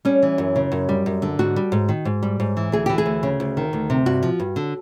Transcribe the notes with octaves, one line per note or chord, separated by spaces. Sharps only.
G3 C#4
E3
F#2
C#3
F#2
G3
F#2
D3
G#2 F#4
G3
G#2
D#3
G#2
G3
G#2
E3
D2 G#4
E3 G4
G#4
D2
C#3
D2
D#3
D2
C3
G2 F#4
F3
G2
D3